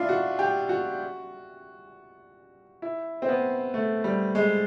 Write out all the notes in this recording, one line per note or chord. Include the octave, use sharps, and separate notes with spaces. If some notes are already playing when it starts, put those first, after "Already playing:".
Already playing: D4 E4 F4
F#4
G4
F#4
E4
C4
B3
A3
G3
G#3